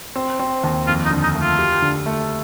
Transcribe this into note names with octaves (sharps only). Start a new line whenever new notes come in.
C4
C4
D#2
F2 F4
D#4
D3
D#4
A3
F4
G4
D3
A3